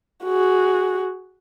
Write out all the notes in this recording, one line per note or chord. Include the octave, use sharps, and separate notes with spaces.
F#4 G#4